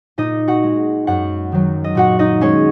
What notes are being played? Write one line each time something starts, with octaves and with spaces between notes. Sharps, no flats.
A#2 D#4 D#5
F#4 F#5
G#3
F#2 F#4 F#5
D#3 F#3
D#5
A#2 F#4 F#5
D#4 D#5
G#3 C#4 C#5